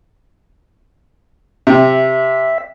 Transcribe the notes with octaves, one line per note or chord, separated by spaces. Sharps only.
C3 E5